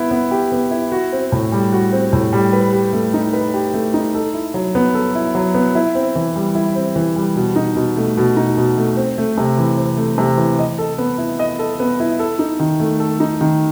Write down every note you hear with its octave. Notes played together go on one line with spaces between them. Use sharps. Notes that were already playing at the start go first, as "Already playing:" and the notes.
Already playing: B3 E4
B3
G4
B3
E4
F#4
C4
A2
G3
F#4
C4
A2
G3
B4
G4
A3
D#4
B4
G4
A3
D#4
A4
E4
F#3
B3
A4
E4
F#3
B3
E4
C4
E3
G3
E4
C4
E3
G3
B2
D#4
B2
A3
B2
D#4
B2
A3
C4
A3
C3
E3
C4
A3
C3
E3
D#5
A4
B3
E4
D#5
A4
B3
E4
A4
D#4
D#3
A3
A4
D#4
D#3